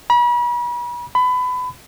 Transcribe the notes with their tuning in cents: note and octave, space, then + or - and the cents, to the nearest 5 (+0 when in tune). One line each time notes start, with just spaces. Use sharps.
B5 -40
B5 +25